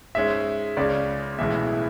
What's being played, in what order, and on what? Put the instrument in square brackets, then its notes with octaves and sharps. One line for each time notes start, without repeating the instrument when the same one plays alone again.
[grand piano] G#2 G#3 C#4 E5
C#2 C#3 G#3 C#4 D5
B1 A2 E3 G#3 B3 E5